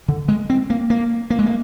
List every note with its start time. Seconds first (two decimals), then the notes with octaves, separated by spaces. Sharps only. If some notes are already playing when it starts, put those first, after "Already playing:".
0.08 D3
0.28 G#3
0.50 C4
0.70 A#3
0.90 A#3
1.30 A#3
1.39 G#3
1.46 A#3